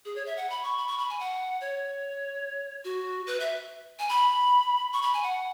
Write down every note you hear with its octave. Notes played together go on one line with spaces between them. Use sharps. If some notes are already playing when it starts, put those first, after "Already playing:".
G#4
C#5
E5
F#5
B5
C#6
B5
C#6
B5
G#5
F#5
C#5
F#4
B4
E5
G#5
B5
C#6
B5
G#5
F#5